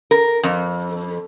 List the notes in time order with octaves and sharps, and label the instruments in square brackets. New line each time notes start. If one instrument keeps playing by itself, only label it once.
[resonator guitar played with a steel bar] A#4
F2